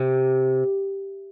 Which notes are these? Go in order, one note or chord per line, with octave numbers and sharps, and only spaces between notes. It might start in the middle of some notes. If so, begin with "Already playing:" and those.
Already playing: C3